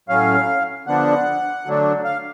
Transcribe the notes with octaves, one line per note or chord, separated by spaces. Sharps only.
A2 F#3 C#4 F5
D3 F3 B3 D4 F#5
D3 F#3 A3 D4
F5